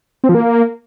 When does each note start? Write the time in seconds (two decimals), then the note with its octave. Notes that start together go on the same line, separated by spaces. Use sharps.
0.24 C4
0.29 F3
0.35 A#3